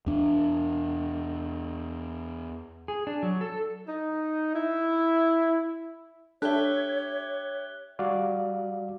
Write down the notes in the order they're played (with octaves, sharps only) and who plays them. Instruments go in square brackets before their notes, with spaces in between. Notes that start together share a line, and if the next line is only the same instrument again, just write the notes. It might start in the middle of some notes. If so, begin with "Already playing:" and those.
[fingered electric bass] E2 D4
[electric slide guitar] G#4
D4
F#3
A4
[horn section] D#4
E4
[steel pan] D4 A4 [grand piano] G4 E5 [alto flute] C#5 [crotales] F#6 G7
[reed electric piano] G3 F#4 D5 F5